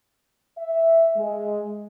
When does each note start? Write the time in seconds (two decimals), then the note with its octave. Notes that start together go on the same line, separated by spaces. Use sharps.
0.57 E5
1.17 G#3